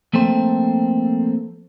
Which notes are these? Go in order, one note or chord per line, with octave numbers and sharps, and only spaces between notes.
F3 A3 A#3 C4 A4 C5